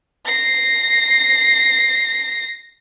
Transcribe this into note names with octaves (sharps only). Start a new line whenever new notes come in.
A#6 C7